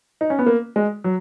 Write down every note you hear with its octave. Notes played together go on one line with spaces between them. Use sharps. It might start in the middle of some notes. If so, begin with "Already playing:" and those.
D#4
C#4
B3
A#3
G#3
F#3